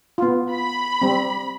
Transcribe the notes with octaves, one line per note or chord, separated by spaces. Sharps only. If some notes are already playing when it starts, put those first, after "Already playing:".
B3 F4
B5
G3 C4